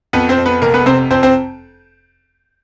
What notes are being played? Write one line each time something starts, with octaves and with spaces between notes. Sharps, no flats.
F2 B3 B4
C4 C5
F2
B3 B4
F1 A#3 A#4
B3 B4
C3 C4 C5
F2 C4 C5
C4 C5